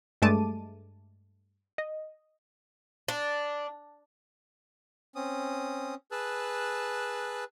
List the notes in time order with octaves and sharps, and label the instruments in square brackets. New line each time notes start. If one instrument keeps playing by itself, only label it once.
[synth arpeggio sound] G2 G#3 A3 A5 D6 D#7
D#5
[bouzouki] D4
[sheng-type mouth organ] C4 C#4 D#6
G#4 B4 A5 E6 F#6